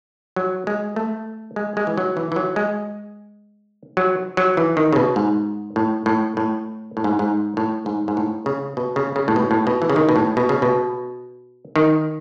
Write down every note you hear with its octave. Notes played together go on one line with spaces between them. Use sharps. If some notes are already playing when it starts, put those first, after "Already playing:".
F#3
G#3
A3
G#3
G#3
E3
F#3
E3
E3
F#3
G#3
F#3
F#3
E3
D#3
C#3
B2
G#2
A2
A2
A2
A2
G#2
G#2
A2
G#2
G#2
A2
C#3
B2
C#3
C#3
A2
B2
A2
B2
E3
C#3
D#3
B2
A2
B2
C#3
B2
D#3